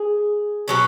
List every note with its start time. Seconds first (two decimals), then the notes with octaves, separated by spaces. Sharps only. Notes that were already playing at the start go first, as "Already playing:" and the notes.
Already playing: G#4
0.68 B2 F#3 C#4